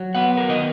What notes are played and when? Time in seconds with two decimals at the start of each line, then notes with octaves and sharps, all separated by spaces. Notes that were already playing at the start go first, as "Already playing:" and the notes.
Already playing: F#3
0.14 B3 F#5
0.37 A#4
0.49 D#3 D#5